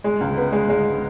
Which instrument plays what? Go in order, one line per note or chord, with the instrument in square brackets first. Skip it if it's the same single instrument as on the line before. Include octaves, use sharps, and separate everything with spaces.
[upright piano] G#3
C#2
B3
G#3
G#3